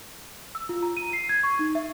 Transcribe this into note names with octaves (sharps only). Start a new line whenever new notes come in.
E6
F4
A#5
D#7
C7
G#6
C#6
D#4
E5